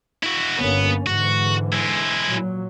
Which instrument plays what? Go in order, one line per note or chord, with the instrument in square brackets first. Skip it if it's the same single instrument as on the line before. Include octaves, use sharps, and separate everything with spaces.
[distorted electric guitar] E4 F#4
[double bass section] G1 A#3 C#4 [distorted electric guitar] B3
[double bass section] G#2 D3 E3 [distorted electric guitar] F#4
[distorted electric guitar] G#3 E4
[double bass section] A#2 F#3